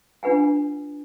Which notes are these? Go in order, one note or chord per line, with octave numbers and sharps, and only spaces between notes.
D4 F4 B4 F#5 G#5